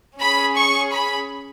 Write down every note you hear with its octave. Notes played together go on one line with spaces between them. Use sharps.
C#4 G#4 B5
C#6
B5